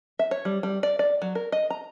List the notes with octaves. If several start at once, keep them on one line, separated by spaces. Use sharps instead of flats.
E5
C#5
G3
G3
D5
D5
F#3
A#4
D#5
A#5